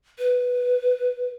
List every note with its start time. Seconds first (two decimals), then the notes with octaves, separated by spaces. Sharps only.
0.18 B4